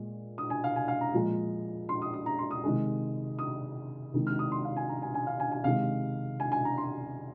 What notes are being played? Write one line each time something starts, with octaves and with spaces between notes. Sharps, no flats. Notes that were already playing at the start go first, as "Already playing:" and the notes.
Already playing: A#2 G#3
D#6
G#5
F5
G#5
F5
A#5
A#2 F3 G#3
C6
D#6
D#6
A#5
C6
D#6
C3 D#3 G#3
D#6
C3 D#3 G#3
F6
D#6
C6
F5
G#5
A#5
G#5
G#5
F5
G#5
G#5
C3 D#3 G#3 F5
G#5
G#5
A#5
C6